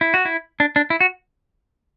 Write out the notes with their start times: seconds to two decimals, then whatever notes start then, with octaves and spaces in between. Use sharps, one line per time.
0.01 E4
0.14 F#4
0.25 E4
0.60 D4
0.76 D4
0.90 E4
1.01 F#4